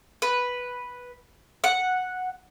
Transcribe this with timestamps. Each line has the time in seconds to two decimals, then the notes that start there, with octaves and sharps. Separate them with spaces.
0.22 B4
1.64 F#5